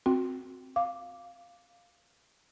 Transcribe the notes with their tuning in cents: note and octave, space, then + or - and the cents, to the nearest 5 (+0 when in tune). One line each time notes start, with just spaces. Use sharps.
C4 +0 F#4 -20 G5 +0
F5 +0 D6 +0